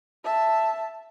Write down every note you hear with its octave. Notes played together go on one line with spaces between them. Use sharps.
E5 A5